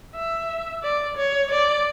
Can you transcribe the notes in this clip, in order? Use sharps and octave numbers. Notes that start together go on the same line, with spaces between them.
E5
D5
C#5
D5